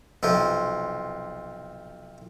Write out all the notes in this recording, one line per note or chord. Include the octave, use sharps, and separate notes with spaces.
B1 C3 F3